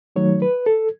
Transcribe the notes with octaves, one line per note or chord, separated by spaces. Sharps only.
D#3 F#3 A3 D#4 C#5
B4
A4